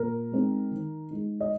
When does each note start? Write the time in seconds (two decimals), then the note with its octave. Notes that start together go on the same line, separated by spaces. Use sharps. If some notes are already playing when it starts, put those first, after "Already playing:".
Already playing: A#2 A#4
0.32 G#3 C4 D#4
0.71 D#3
1.11 G#3 D#4
1.41 D#5